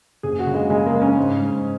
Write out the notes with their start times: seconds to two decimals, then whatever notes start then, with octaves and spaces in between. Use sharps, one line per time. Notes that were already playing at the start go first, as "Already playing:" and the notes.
0.23 F#1 G#4
0.39 F#4
0.47 C#3
0.55 G#3
0.70 C#3 G#3
0.86 A#3
0.94 G#3
1.02 C#4
1.17 G#2
1.41 G#2